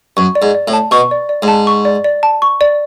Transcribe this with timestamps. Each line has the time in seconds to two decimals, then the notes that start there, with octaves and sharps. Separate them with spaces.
0.17 F#2 C#6
0.35 D5
0.42 G#2
0.55 D5
0.68 A2
0.73 A5
0.91 B2 C#6
1.11 D5
1.29 D5
1.42 G#2
1.48 A5
1.67 C#6
1.85 D5
2.04 D5
2.23 A5
2.42 C#6
2.61 D5